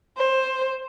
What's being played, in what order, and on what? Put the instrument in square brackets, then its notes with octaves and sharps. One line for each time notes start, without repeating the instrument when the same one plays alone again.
[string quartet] C5